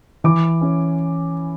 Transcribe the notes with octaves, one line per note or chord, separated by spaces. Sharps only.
E3 D6
C#4